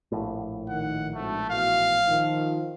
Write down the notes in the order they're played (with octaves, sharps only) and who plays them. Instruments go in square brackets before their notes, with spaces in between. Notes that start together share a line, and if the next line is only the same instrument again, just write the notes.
[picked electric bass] A#1 A2
[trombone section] D#3 [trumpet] F#5
[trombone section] G#1 D2 [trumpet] A3
[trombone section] B2 E3 [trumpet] F5
[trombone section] D#3 F3